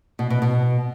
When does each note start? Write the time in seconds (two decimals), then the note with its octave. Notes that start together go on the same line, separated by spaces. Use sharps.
0.19 B2
0.30 B2
0.42 B2